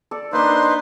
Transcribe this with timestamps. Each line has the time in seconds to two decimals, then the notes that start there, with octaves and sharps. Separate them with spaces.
0.11 A4 D5
0.33 A#3 D4 D#4 B4 C5 C6